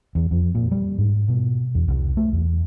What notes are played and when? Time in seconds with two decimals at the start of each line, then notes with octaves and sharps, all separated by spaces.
0.15 E2
0.31 F2
0.55 A#2
0.71 G3
0.98 G#2
1.28 B2
1.75 E2
1.88 C2
2.17 A3
2.33 E2